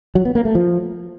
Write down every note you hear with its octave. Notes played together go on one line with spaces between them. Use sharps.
F#3
B3
A#3
A3
F3